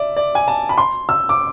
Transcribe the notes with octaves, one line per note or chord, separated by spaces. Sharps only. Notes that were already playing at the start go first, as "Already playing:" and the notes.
Already playing: D5 E5
D5
G#5
A5
B5
C6
E6
D6